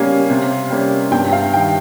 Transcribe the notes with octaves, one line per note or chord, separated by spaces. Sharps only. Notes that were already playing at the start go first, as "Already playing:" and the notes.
Already playing: C#3 G3 A#3 C#4 F5 G#5
C3
G3 A#3 C#4
G2 G5
F5
D#3 G3 G5